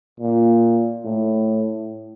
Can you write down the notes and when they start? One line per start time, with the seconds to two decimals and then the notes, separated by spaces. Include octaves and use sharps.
0.20 A#2
1.05 A2